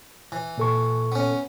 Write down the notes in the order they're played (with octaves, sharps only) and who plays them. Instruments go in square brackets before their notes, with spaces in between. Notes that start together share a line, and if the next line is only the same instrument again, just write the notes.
[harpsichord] E3
[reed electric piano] A#2 A4 C#6
[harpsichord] B3 C#4